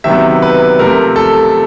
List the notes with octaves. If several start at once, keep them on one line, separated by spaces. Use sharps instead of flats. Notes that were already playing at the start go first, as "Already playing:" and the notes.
C3 D#3 F#3 B3 E5
B4
C3 F3 A3 A#4
A4